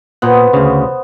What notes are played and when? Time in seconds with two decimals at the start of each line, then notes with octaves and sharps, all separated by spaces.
0.22 A#2 B3 C5 F#5
0.53 D2 C#3